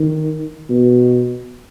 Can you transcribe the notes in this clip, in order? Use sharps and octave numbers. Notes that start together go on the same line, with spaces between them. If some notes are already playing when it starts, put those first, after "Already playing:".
Already playing: D#3
B2